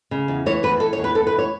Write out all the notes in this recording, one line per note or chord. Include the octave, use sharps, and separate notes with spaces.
C#3
E2
E3 C#5
E2 B4
E2 A4
C#5
E2
B4
E2 A4
B4
E2
C#5